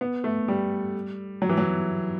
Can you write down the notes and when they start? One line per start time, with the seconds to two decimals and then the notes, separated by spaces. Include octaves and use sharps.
0.01 B3
0.24 A3
0.48 G3
1.42 F#3
1.49 E3
1.57 F#3